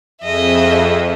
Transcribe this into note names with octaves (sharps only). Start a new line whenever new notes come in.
F2 G#4 D#5 E5